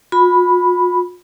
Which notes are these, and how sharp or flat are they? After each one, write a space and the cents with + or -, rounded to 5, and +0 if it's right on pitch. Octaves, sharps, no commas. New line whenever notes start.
F4 +45 B5 +0